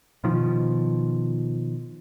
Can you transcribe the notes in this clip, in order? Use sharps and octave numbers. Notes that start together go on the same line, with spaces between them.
B2 D#3 F3